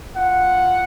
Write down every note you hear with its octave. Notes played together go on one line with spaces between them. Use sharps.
F4 F#5